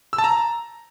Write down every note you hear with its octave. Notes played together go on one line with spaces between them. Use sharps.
E6
A5
A#5